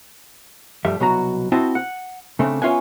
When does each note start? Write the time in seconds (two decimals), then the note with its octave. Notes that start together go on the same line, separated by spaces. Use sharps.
0.85 G2 F3 G3 A3 E5
1.00 C2 B2 F#3 F#4 A#5
1.52 C4 E4 F#4 C5 D#5 A5
1.75 F#5
2.39 C#3 A3 C4 D4
2.62 B3 C#4 F4 E5 F#5 G#5